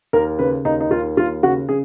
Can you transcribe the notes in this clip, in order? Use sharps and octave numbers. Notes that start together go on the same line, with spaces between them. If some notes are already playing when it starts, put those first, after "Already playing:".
D#2 A#4
C#3 B4
D#2 D#4
D#4
D#2 F4
D#2 F4
C#3 F#4
C#3 G#4